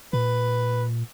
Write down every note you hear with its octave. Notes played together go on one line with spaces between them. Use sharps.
A#2 B4